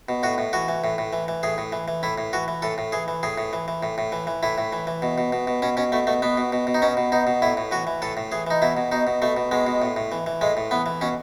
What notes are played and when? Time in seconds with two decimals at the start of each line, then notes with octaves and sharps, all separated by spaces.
0.09 B2
0.23 A2 F#4
0.38 A2
0.53 E3 F#4
0.68 E3
0.84 A2
0.98 A2
1.13 E3
1.28 E3
1.43 A2 G#4
1.58 A2
1.72 E3
1.88 E3
2.03 A2 E4
2.18 A2
2.33 E3 F#4
2.48 E3
2.62 A2 A4
2.78 A2
2.92 E3 G#4
3.08 E3
3.23 A2 G#4
3.38 A2
3.53 E3
3.68 E3
3.83 A2
3.98 A2
4.12 E3
4.27 E3
4.43 A2 E4
4.58 A2
4.73 E3
4.87 E3
5.02 B2
5.18 B2
5.33 B2
5.47 B2
5.62 B2 C#4
5.77 B2 C#4
5.92 B2 A3
6.07 B2 A3
6.22 B2 B3
6.37 B2
6.52 B2
6.67 B2
6.74 D#4
6.82 B2 C#4
6.97 B2
7.12 B2 D#4
7.27 B2
7.42 A2 E4
7.57 A2
7.71 E3 F#4
7.87 E3
8.02 A2 A4
8.17 A2
8.32 E3 G#4
8.47 E3 D#4
8.62 B2 E4
8.77 B2
8.92 B2 D#4
9.07 B2
9.22 B2 A3
9.37 B2
9.51 B2 G#3
9.67 B2
9.82 A2
9.96 A2
10.12 E3
10.26 E3
10.41 A2 G#3
10.57 A2
10.71 E3 B3
10.86 E3
11.01 B2 C#4